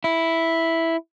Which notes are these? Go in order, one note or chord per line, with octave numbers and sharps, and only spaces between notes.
E4